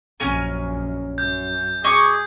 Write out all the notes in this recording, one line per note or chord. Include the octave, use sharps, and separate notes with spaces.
A#1 F#2 C#4 A#4 G#5
F#2 G6
G#4 D#5 C#6 D6